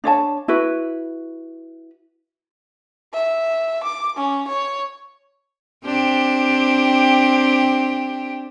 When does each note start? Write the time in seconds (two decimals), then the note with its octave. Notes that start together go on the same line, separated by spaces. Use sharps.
0.04 D4 C#5 D#5 A5
0.48 E4 F#4 B4
3.14 E5
3.84 D6
4.17 C#4
4.48 C#5
5.85 C4 D4 G4